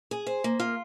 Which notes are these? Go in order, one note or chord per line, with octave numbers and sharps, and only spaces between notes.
G#4
C5
A#3
F4